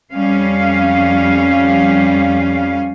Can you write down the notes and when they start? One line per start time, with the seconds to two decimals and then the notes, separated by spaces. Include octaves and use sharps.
0.14 F2 G3 C#4 F5